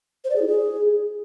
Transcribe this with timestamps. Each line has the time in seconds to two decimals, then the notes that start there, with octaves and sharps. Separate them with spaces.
0.24 C5
0.30 D5
0.36 G#4
0.42 E4
0.47 G#4